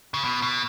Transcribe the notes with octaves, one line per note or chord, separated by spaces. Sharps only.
C#3
B2
B2